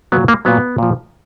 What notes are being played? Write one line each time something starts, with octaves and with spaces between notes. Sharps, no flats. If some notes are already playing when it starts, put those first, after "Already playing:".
A#2 F#3 B3
A#3
A#2 F#3 B3
A#2 F3